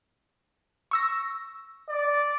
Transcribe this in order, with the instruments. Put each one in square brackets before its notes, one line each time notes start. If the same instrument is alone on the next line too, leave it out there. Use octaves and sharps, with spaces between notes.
[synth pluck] C#6 E6 A#6
[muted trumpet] D5